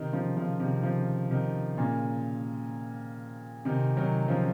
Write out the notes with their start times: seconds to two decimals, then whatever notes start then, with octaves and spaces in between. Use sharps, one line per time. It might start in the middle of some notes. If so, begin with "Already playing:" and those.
Already playing: C3 D#3
0.13 C#3 F3
0.37 C#3 F3
0.60 C3 D#3
0.83 C#3 F3
1.31 C3 D#3
1.77 A#2 C#3
3.65 C3 D#3
3.97 D#3 F#3
4.28 C#3 F3